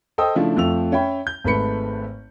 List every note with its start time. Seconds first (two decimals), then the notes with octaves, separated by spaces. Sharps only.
0.18 A4 C5 D#5 G5 D#6 E6
0.35 C#3 F3 A3 D4 E4 F4
0.56 F2 F3 A3 E6 F7
0.92 C#4 C#5 E5 G5 B5
1.27 G6
1.44 G#1 G#2 A3 B4 B5 C#7